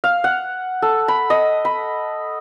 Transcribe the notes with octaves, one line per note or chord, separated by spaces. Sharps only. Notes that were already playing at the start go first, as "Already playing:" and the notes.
F5
F#5
A4
B5
D#5
B5